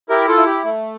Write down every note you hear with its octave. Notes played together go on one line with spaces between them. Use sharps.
E4 G4 A#4
F4 A4
E4
G4
A3